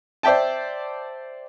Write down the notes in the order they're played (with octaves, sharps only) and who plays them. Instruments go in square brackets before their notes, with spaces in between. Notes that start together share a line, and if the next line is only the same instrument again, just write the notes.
[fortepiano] C5 D5 E5 G5 A5